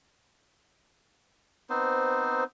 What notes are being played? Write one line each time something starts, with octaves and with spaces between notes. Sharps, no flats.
B3 C4 D#4 C5